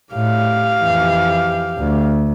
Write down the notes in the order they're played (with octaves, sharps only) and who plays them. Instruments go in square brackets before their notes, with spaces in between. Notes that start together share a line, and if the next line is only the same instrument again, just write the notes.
[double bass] A2 [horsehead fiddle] G4 F5
[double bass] F2 E3
D2